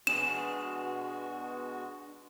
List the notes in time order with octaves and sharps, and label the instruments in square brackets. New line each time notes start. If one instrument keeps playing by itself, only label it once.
[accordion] B2 G#3 F#4 [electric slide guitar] D4 G#4 [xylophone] E7